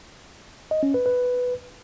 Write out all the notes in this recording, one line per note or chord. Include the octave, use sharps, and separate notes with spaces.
D#5
C#4
B4
B4